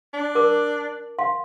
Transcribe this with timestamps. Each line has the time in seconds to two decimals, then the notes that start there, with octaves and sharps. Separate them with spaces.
0.14 D4
0.35 A#4 D6
1.19 F5 C6